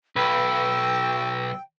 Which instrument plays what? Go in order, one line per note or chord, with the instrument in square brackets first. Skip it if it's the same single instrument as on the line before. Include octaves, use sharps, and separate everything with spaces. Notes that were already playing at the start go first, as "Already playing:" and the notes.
[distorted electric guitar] B1 [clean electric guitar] B4 [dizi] G5 [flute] E6